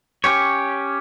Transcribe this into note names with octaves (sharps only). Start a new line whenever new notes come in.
C#4 G4 C#5